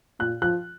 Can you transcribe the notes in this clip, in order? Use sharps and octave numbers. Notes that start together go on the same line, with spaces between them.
A#2 F#6
F3 F#6